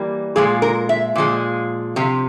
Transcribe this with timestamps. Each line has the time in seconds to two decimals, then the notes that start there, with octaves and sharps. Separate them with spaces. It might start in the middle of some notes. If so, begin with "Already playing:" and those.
Already playing: E3 G3 A#3
0.36 A#2 F3 G#3 G#4
0.62 A#4
0.89 E5
1.16 A#2 F3 G#3
1.96 C3 F3